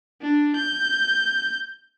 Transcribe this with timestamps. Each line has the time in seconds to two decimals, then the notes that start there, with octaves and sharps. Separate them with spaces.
0.22 D4
0.56 G6